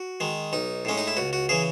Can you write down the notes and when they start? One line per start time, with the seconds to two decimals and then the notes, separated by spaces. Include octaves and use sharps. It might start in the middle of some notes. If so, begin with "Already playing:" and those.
Already playing: F#4
0.20 D#3 G#3
0.53 B1 D#4
0.85 A2 G#3 C#4
0.98 D#4
1.08 E4
1.17 C#2 F#4
1.33 F#4
1.49 C#3 E3 G#4